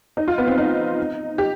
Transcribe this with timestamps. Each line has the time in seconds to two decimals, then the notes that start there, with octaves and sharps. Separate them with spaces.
0.17 D#4
0.28 F4
0.38 B3
0.47 C4
0.58 D#4
1.38 G4